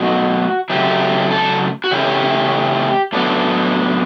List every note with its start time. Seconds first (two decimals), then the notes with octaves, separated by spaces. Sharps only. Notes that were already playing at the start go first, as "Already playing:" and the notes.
Already playing: B2 F#3 A3 F#4
0.70 C#3 F#3 A3 E4 G4
1.31 A4
1.84 F#4
1.91 C#3 E3 A3 C#4 E4 G4
3.13 A2 F#3 B3 D4 A4